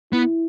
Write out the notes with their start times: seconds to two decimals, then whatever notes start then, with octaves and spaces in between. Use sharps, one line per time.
0.13 B3 E4